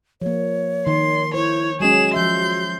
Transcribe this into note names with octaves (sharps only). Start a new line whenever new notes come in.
F3 A#3 C#5
D#3 C6
E4 C5 C#5
F#3 G#3 C#4 F#4 G#4 E7
F3 E5 C6 G6